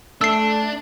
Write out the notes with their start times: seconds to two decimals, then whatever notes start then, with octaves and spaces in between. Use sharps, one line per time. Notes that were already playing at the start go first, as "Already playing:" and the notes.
0.21 A3 D4 E6 C7